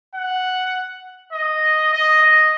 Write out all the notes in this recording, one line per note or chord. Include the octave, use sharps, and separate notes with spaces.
F#5
D#5
D#5
D#5